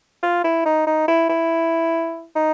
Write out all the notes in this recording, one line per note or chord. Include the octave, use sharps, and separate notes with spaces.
F4
E4
D#4
D#4
E4
E4
D#4